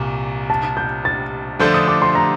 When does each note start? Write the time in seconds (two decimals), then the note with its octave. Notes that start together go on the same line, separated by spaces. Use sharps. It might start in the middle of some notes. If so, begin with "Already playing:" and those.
Already playing: C2 A#2 G3
0.50 A5
0.77 G6
1.05 A6
1.60 D3 F3 A3 D4 A4 G6
1.74 D#6
1.88 D6
2.02 C6
2.15 A#5